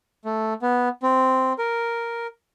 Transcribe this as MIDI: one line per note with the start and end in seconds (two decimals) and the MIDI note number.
0.25 0.54 57
0.62 0.89 59
1.03 1.53 60
1.58 2.27 70